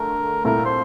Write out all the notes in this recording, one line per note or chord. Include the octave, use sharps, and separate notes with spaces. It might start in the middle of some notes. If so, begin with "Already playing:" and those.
Already playing: D3 A3 A4 A#4
C2 A#2 A3 E4 A4 A#4
C5